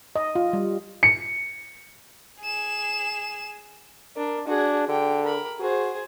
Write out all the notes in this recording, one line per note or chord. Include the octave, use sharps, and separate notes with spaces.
D#5
F4
G3
C#7
G#4 E7
D4 A#4
D4 F#4 G#4
D3 G5
A#4 B5
F#4 G#4 C5